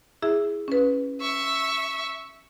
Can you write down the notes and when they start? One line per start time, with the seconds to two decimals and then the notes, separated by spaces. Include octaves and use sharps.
0.22 E4 G#4 E5
0.68 C#4 B4
1.21 E5 C#6